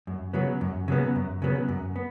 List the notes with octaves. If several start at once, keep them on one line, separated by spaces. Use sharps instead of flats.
F#2
C#3 F#3 B3
F#2
C#3 F#3 B3
F#2
C#3 F#3 B3
F#2
B3